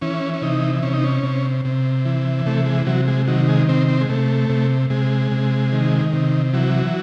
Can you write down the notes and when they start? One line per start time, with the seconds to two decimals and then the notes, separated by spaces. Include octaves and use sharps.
0.02 E3 C#4
0.34 C#4
0.42 C3 D#4
0.83 C3 C#4
0.93 D#4
1.04 C#4
1.23 C3
1.65 C3
2.05 E3
2.45 C3 A3
2.66 G#3
2.86 C3 F#3
3.08 G#3
3.27 D#3 F#3
3.48 G#3
3.69 C3 C4
3.88 C4
4.01 G#3
4.09 C3 A3
4.50 C3
4.90 C3 G#3
5.32 C3
5.72 D#3
6.13 C3
6.53 E3 F#3